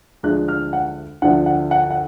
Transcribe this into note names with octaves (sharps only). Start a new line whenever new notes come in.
D2 D3 F3 G#3 F#6
F6
F#5
D2 D3 F3 F#5
F#5
F#5
F#5